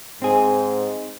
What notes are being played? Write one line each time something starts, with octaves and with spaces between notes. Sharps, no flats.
G#2 C4 G#4